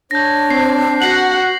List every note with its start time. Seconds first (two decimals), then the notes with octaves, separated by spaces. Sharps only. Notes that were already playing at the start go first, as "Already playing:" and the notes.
0.11 D4 C#5 G6 A#6
0.50 C4 C7
1.02 F#4 F#5 A#6 C7 F#7